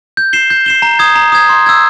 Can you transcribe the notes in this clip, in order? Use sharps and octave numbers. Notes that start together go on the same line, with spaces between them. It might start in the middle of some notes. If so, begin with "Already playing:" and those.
G6
C7 E7 G7
G6
C7 E7 G7
A#5
D#6 G#6
A#5
D#6 G#6
C6
E6 G#6